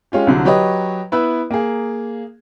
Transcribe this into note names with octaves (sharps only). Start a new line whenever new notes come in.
G#3 C#4 F4 G4
C2 D3 F#3
F#3 G4 B4 C#5 D#5
B3 E4 B4 E6
A#3 G#4